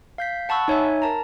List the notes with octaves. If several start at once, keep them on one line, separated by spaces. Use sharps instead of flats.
F5 G6 B6
F#5 A5 B5 C#6 E6 F#6
D#4 C#5 E5 G#5
A#4 A5 A#5